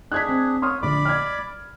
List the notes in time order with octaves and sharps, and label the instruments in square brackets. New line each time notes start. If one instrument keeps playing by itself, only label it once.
[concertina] D4 G#4 [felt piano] F#6 G#6 B6
[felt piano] C4
[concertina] C#5 [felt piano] C6 D#6 F6
[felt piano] A#1 D3 [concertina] D5 B5 D6
[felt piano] F6 G#6